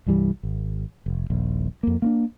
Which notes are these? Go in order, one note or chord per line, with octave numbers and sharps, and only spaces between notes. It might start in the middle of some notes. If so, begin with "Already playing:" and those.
C2 G2 E3 G3
G#1
F1
D#1 A#1
F2 A#3
A#3 C4 D4